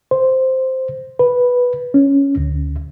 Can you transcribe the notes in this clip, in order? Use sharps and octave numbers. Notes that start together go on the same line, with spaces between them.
C5
B4
C#4
D2